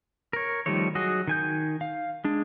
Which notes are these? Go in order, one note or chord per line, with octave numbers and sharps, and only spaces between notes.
A#4 C#5
D#3 F3 G3 A3 C#5
F#3 F#4 G#4 D#5
D#3 G#5 G6
F5
G#3 D4